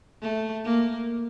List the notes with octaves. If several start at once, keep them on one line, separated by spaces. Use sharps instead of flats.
A3
A#3